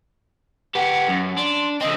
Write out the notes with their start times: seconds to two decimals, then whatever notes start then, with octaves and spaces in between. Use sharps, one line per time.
0.75 B3 G4 F#5
1.09 F#2
1.37 D4 C6
1.81 D3 C4 D#5